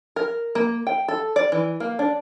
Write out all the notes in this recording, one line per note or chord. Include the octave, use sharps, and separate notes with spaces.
A#4
A#3
G5
A4
D5
E3
A#3
D4